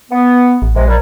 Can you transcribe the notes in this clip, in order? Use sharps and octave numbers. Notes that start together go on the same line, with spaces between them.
B3
A1
A#1 C3 E3 G#3
A#2 F#3 G3